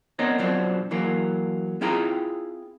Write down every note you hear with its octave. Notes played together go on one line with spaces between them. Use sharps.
B3 C4 D4 A#4 C#5 D#5
F#2 B2 F3 F#3 C4 D4
E3 F#3 A#3
C4 E4 F4 G#4 G5 A#5